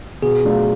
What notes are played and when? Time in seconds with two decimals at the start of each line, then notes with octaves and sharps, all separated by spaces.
0.22 B2 G#4
0.43 F#3 A3 D4 F4